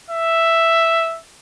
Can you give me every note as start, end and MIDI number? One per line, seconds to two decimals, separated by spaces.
0.10 1.19 76